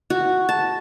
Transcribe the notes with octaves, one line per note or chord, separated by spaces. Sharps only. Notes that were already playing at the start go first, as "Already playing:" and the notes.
F#4
A5